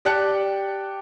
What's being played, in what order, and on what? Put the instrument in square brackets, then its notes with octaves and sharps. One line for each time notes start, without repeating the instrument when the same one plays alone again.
[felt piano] G4 D5 G5 A5 F#6 C#7